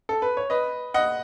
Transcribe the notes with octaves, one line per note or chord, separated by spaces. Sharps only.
A4
B4
C#5
B4 D#5
D#5 F#5